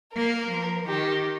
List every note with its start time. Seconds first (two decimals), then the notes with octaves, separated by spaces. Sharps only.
0.15 A#3 A#4
0.51 F3
0.87 D#3 G4